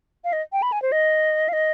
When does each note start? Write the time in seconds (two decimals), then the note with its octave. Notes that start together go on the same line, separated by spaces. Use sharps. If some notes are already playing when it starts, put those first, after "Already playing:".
0.24 F5
0.33 D#5
0.53 G5
0.62 B5
0.72 G#5
0.82 C5
0.92 D#5
1.49 F5
1.53 D#5